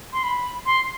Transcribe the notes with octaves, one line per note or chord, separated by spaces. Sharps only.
C6
B5
C6